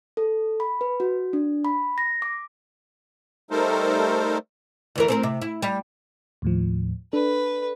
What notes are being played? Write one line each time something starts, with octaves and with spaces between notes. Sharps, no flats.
A4
B5
B4
F#4
D4
B5
A#6
D6
G3 A3 D#4 A4 A#4 C5
D2 E3 A#4
C4 A4 A#4
C3
E4
G3
D#2 A2 F3
D4 A4 B4